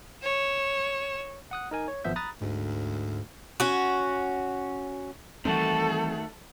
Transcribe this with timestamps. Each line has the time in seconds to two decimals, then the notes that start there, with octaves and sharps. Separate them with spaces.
0.23 C#5 E7
1.51 F#5 D#6 F#6
1.71 D#4 A#4 G#5
1.88 C#5
2.04 G#1 F3 B3 E5 G6
2.16 A#5 B5 D#6 F#6 A6
2.41 D2 G#2
3.60 C#4 F#4
5.45 D#3 E3 G3 A3 C4 F#4 A4